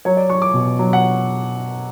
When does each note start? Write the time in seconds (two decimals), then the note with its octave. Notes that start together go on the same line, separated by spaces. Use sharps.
0.05 F#3 C#5
0.17 D5
0.30 F#3 C#6
0.42 D6
0.54 B2
0.79 F#3
0.93 F#5